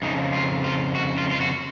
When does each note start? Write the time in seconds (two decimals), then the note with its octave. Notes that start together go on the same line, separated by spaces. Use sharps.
0.02 F2 C#3 D#4
0.33 F4
0.64 F4
0.95 F#4
1.18 F4
1.31 F4
1.41 F#4